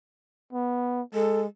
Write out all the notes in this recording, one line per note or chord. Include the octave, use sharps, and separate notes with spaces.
B3
G#3 A4